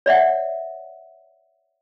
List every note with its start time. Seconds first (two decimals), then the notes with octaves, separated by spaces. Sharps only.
0.06 C#5 D5 E5 F#5